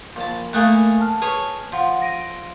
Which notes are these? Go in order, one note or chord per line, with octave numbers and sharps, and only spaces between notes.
A#1 A5
A2 A3 A#3 G#5 D#6 F#6
A5 F6
G#4 B4 C#5
F3 F5 F#5
A#6 D7 D#7